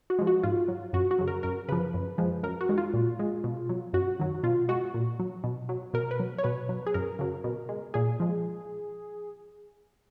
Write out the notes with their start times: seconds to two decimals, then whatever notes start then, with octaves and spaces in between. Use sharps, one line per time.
0.10 F#4
0.19 F3 G#3
0.27 F#4
0.43 G#2 F4
0.68 F#3
0.93 F#2 F#4
1.11 F#4
1.19 C#3 F#3
1.28 A#4
1.43 F#2 A#4
1.69 C#3 F3 B4
1.94 F#2
2.18 F3 G#3
2.43 F#2 A#4
2.61 F#4
2.69 D#3 G#3
2.78 F4
2.94 A#2
3.19 G#3
3.44 B2
3.69 F#3
3.93 F#2 F#4
4.20 D#3 F#3
4.43 B2 F4
4.69 G#3 F#4
4.94 A#2
5.19 F#3
5.44 B2
5.69 F#3
5.94 B2 A#4
6.11 B4
6.20 F#3
6.38 C#5
6.44 B2 B4
6.69 F#3
6.87 G#4
6.94 F#2 A#4
7.19 C#3 F#3
7.44 B2
7.69 G#3
7.94 A#2 G#4
8.20 F3 G#3